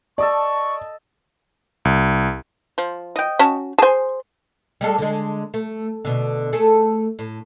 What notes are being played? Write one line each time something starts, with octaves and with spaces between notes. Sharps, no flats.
A4 D5 D#5 A5 C#6
C2
F3
D#5 G5
C#4 F#4 A5
G#4 C5 G#5 A5
G3 G#3 A4
D3 G#3
A3
B2 D3
A3 G#4 A4
A2